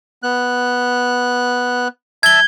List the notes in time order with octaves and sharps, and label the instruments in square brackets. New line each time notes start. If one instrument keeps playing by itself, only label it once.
[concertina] B3 F#6
[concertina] E5 A5 [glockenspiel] G#6 G7